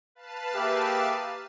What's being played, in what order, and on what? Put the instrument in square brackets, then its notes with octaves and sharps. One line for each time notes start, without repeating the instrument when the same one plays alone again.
[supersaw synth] B4 F5 A5
[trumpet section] A#3 G#4 E5 [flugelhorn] G4